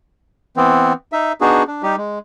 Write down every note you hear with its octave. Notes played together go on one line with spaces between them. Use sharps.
E3 B3 C4
D#4 E5
B3 D4 D#4 F#4 G#4
D4
G3 D#4 G4
G#3